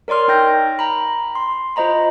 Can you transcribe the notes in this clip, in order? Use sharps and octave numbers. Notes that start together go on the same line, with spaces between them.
A#4 C#5 D5 C6 F6
D#4 G5 G6 A#6
A#5 B5
C6
F4 C5 D#5 A#5 B5